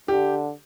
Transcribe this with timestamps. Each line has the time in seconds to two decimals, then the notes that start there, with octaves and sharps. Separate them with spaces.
0.08 D3 G4